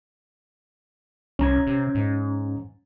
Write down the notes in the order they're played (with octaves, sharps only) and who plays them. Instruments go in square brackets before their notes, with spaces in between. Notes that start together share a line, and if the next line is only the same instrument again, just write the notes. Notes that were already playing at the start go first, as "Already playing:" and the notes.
[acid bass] C2 [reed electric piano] C#4 A#5 G#6
[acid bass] C3
G#2